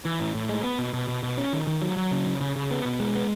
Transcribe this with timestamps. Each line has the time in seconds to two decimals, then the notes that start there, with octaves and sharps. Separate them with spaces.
0.05 E3
0.20 A2
0.34 A2
0.49 G#3
0.63 B3
0.78 B2
0.93 B2
1.08 B2
1.23 B2
1.37 C#4
1.53 D#3
1.67 D#3
1.82 F#3
1.97 F#3
2.12 C#3
2.26 C#3
2.41 C#3
2.56 C#3
2.71 B3
2.85 B2
3.00 G#3
3.15 B3